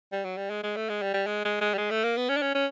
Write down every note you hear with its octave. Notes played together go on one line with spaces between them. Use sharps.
G3
F#3
G3
G#3
G#3
A3
G#3
G3
G3
G#3
G#3
G#3
G3
G#3
A3
A#3
B3
C#4
D4
C#4
C#4